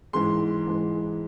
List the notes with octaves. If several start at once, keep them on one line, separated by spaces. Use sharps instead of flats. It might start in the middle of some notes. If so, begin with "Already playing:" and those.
G#2 E3 G#3 C6
G#2 E3 G#3